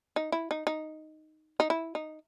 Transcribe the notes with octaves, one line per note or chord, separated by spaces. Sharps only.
D#4
E4
D#4
D#4
D#4
E4
D#4